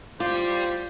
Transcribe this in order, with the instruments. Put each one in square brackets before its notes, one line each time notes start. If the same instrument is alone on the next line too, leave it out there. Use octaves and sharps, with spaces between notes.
[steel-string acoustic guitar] F4 [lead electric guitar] G4 D5 [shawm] C5